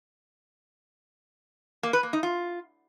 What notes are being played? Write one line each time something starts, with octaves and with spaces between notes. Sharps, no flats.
A#3
B4
A#3
D#4
F4